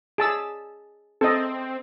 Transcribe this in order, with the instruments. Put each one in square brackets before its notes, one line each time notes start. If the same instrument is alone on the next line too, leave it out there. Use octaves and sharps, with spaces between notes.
[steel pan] G#4 A5 E6
[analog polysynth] C4 [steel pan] A4 D#5